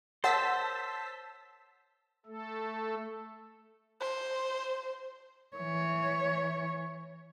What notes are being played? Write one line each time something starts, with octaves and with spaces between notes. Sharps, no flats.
A#4 C5 C#5 F#5 A5 E6 B6
A3 A4
C5
E3 C#5